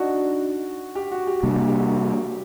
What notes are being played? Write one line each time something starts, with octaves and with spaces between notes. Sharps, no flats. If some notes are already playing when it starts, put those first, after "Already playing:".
Already playing: D4 D#4 F#4
G4
F#4
G4
C3 G3 A#3 D4 G4
G4
F#4